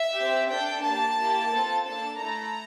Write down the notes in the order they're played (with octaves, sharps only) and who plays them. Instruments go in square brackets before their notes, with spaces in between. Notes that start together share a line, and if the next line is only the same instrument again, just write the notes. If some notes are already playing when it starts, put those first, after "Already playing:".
Already playing: [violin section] E5
C4 G4
D4 A4 G5
A#3 D4 G4 A5
A#3 E4 G4
C4 F4 A4
A#3 D4 A4 A5
A3 E4 A4 A#5